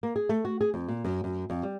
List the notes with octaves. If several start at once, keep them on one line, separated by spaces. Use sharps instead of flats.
A#3
G#4
A3
F#4
G#4
F2
A#2
F#2
F#2
F2
G3